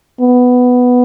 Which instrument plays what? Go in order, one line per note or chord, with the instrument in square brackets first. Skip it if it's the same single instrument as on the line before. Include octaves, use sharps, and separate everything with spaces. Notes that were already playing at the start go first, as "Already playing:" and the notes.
[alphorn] B3